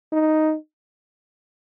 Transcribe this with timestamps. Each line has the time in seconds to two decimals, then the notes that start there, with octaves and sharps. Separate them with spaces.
0.12 D#4